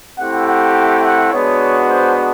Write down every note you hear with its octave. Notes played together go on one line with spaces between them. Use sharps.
A3 C4 E4 G4 F#5
F#5
F#5
G#3 B3 D4 F#4 C#5
C5